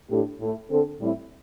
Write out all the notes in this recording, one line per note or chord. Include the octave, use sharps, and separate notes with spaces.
A2 A3 D4 G4
A2 A3 E4
D3 C4 A4
A2 G3 C4 E4